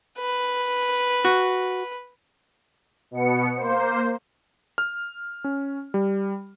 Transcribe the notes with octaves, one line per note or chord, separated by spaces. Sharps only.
B4
F#4
B2 B3 C#7
A#3 C5
F6
C#4
G3